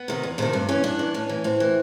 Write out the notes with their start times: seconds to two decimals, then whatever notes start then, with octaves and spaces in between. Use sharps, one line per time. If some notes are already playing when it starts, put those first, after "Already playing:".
Already playing: B3
0.08 C3 D#3
0.23 E2
0.38 C3 D#3 A3
0.53 G2 D4
0.69 E3 C#4
0.84 G2 D4
0.99 E3
1.14 A2 C#4
1.29 E3
1.44 A2 C4
1.60 E3